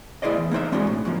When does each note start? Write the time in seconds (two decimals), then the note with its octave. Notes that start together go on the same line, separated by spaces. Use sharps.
0.22 E4 G#4 C5 D5 D#5
0.37 E2
0.51 A#3 D#4 C5 E5
0.72 G#3 C4 D4 E4 F#4 G#4
0.87 A2
1.05 F#2 B2 F3